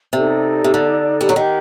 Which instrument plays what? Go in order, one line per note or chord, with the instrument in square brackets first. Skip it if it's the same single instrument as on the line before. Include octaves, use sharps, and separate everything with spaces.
[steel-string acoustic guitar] C3 [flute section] D#4 A4 D5
[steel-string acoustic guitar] C3
D3
G3
F#3
[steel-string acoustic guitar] D#3 [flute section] G4 A#4 F#5